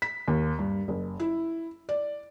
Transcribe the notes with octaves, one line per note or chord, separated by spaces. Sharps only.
B6
D#2
G2
F#1
E4
D5